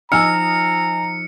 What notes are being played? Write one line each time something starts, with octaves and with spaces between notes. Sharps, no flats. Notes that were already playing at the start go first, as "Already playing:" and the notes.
F3 D#4 D#5 G#5 A#5 E6 F6 C#7